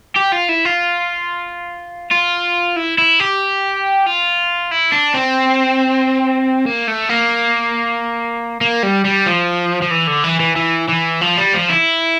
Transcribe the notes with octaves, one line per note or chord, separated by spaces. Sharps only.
G4
F4
E4
F4
F4
E4
E4
G4
F4
E4
D4
C4
A#3
A3
A#3
A#3
G3
G3
F3
F3
E3
D3
E3
E3
E3
E3
F3
G3
F3
E4